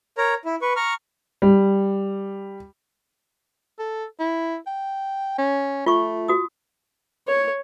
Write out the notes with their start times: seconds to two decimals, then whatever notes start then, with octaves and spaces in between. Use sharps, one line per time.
0.18 A#4 C#5 A#5
0.45 E4
0.62 B4 C#6
0.76 A#5 C#6 F6
1.42 G3
3.79 A4
4.19 E4
4.67 G5
5.38 C#4
5.86 A3 F4 C#6
6.28 F#4 D#6
7.27 C#5